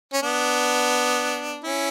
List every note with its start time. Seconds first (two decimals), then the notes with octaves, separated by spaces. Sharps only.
0.13 C#4
0.22 B3 D4
1.64 C#4 E4